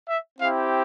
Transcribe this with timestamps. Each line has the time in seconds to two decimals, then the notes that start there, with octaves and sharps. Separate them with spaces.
0.08 E5
0.39 C4 E4 G4 F5